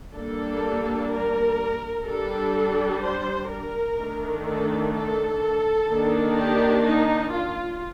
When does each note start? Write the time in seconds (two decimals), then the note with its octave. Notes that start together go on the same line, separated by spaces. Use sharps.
0.15 G3 A#3 D4 A4
1.11 A#4
2.06 G3 D4 A4
3.03 C5
3.50 A#4
3.98 D#3 A3 D4
4.46 A4
4.94 A4
5.89 D#3 A#3 D4
6.37 G4
6.86 D#4
7.33 F4